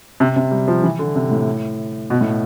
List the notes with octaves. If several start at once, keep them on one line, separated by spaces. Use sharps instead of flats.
C3
C3
G3
F3
E3
D3
C3
A2
B2
A2